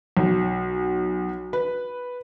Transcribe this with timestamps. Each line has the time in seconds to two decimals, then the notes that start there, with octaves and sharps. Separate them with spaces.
0.17 B1
1.53 B4